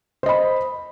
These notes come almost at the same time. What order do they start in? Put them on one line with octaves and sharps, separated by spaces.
C5 D#5 B5